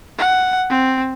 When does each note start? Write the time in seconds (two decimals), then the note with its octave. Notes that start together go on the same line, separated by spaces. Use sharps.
0.18 F#5
0.70 C4